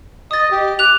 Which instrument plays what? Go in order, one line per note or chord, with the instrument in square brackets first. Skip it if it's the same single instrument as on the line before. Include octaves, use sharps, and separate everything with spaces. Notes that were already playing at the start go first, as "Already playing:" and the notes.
[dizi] D#5 [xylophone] D#6 A6
[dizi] G4
[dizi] D6 [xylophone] F#6 F7